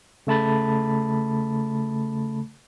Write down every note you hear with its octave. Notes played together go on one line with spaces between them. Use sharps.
C#3 A3 A5 B5 A6